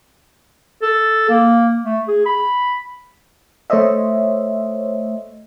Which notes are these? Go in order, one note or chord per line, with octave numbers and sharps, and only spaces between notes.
A4
A#3
A3
G#4
B5
A3 C5 C#5 D#5 E5